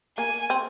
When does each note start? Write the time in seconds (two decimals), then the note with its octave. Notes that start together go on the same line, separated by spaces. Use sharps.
0.18 A#3 G#5
0.50 C4